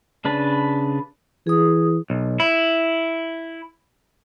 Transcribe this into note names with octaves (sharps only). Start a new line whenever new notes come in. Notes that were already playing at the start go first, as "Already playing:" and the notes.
C#3 D4 B4 A5
E3 G#4 D#6
B1
E4